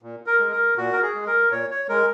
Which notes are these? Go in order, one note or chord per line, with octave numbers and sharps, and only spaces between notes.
A#2
A#4
G#3
A#4
A#2 F#4
A#4
G#4
G#3
A#4
A#2 C#5
C#5
G#3 A#4